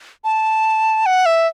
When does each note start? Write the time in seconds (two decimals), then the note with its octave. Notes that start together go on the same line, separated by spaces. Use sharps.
0.24 A5
1.06 F#5
1.26 E5